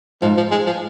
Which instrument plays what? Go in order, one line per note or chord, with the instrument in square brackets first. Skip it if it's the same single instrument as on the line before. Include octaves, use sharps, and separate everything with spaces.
[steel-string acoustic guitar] G#2 [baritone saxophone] F3
[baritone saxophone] F3
G#3
F3